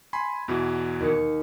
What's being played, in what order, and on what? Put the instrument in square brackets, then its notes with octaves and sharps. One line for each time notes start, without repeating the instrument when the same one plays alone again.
[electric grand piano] G#5 B5 C6
E2 B2 E3
[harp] D#2 C#7